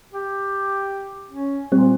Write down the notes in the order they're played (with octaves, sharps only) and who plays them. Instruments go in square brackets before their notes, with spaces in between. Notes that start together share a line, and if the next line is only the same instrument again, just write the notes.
[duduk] G4
C#4
[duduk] A#2 [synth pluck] G3 C4